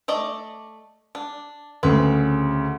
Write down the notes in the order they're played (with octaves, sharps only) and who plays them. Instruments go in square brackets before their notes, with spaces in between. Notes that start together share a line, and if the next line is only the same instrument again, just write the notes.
[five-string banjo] A3 D5 D#5
D4
[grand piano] D2 C#3 [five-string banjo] C4 B4